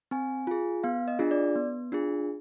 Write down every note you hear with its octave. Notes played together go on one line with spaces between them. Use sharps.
C4 G#5
F4 G#4
B3 F5
D#5
D4 F4 G#4
D5
B3
D4 F4 G#4